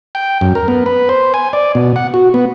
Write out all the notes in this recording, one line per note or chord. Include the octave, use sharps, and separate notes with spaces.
G5
F#2
A#4
B3
B4
C5
G#5
D5
B2
F#5
F#4
B3